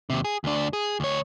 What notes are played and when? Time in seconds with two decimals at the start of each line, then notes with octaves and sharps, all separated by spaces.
0.10 D#2 C3
0.25 G#4
0.44 D2 D4
0.73 G#4
1.00 D2 C#5